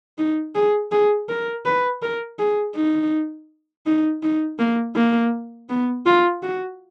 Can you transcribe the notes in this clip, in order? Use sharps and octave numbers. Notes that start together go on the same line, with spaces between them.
D#4
G#4
G#4
A#4
B4
A#4
G#4
D#4
D#4
D#4
A#3
A#3
B3
F4
F#4